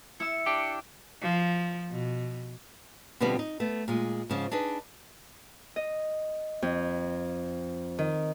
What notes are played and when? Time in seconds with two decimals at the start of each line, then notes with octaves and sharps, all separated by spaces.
0.20 E4 E6 C#7
0.46 D4 G4
1.22 F3
1.91 B2
3.20 B2 D3 F3 G3 B3 C4
3.39 D#4
3.60 A3 B3
3.88 A#2 G#3
4.29 G#2 C#3 F3
4.51 D4 D#4 G#4 B4
5.76 D#5
6.62 F2
7.99 D#3